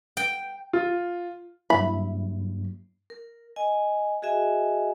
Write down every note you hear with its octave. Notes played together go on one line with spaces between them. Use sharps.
G5
F4
G2 F#3 A#3 E4 B5
A#4
D#5 G#5
F#4 G#4 D#5 E5 G#5